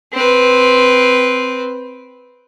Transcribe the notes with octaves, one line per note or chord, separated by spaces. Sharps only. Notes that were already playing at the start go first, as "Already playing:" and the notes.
C4 B4